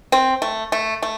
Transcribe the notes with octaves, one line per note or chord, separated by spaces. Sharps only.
C4
A3
A3
A3